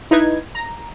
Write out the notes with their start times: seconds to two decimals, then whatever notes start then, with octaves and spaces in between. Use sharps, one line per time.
0.11 D#4 E4 B4 G#6
0.55 A#5